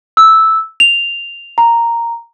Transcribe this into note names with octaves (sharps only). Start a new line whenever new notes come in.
E6
F7
A#5